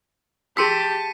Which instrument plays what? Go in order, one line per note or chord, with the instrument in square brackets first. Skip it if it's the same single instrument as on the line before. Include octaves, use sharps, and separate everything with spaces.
[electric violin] G4 [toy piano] G#4 C6 E6 [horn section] A5 [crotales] B6 C#7 D#7